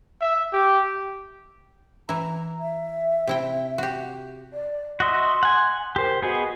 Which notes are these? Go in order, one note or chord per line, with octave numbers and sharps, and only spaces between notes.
E5
G4
E3 E4 A#5
E5
C3 E4 G5
F#4 G4
D5
F#4 D#5 E5 C6
F#5 G#5
G4 A#4 C5
B3 F#4 G#4 D#5